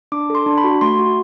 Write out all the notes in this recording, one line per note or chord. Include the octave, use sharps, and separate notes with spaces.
D4 D6
A4
C6
D4
B5
F#4
A3 C6
F#4